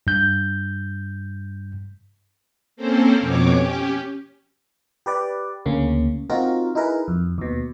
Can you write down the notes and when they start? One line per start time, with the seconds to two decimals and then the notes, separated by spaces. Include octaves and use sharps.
0.07 G2 G6
2.76 A#3 C4 C#4 A4 C5
3.19 F2 B2 C#5 D6
3.50 C#4 G4
5.06 G4 B4 D5
5.66 D2 C#3 A#3 C#4
6.30 C4 D#4 F4 F#4 A#4
6.75 D#4 E4 G#4 A#4 B4
7.08 F2
7.38 D#2 B2